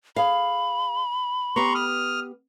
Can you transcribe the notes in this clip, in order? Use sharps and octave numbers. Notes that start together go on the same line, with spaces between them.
G#4 F5 B5
B3 G4 A#5 C6 C#6
D#6 F6